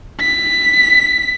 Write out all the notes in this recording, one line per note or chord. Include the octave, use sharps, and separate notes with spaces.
B6